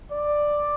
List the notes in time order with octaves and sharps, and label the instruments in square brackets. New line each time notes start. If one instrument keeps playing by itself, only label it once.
[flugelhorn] D5